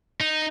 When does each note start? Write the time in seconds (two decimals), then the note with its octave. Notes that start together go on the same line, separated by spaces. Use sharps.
0.20 D#4